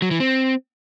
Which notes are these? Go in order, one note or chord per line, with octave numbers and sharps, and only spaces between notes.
F#3
E3
C4